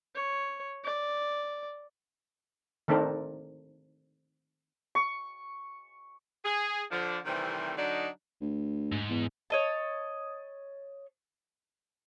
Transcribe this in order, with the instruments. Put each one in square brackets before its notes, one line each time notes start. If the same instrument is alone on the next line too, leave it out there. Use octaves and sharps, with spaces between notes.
[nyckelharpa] C#5
D5
[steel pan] D#3 A3 C4 D4 A4 A#4
[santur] C#6
[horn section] G#4
D3 F3 D4
C3 D#3 E3 G3 A3 C4
D3 F#3 D4 D#4
[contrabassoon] D2
[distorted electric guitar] G#2
[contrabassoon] E2
[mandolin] C#5 D#5 A5